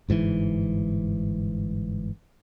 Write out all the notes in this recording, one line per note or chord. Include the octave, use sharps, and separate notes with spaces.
G1 G#2 D3 E3